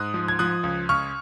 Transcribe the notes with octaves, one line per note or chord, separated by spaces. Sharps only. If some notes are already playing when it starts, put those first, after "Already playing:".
Already playing: G#2 D#6 F#6
F3
G#6
F3 D#6 F#6
C#2
C#2 C#6 F6